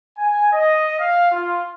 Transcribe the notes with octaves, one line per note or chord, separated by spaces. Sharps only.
G#5
D#5
F5
F4